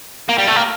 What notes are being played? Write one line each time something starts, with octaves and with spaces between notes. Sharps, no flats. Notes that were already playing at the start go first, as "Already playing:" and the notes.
A#3
G3
A3
A#3